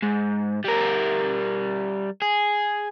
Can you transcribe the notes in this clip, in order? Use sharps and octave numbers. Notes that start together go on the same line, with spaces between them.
G#2
G3 A#4
G#4